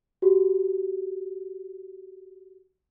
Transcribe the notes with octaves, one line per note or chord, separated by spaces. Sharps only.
F#4 G4